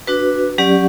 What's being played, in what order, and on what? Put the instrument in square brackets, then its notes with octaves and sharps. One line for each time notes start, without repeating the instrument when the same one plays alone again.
[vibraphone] D4 F#4 B4
F#3 C#4 G4 D5 F#5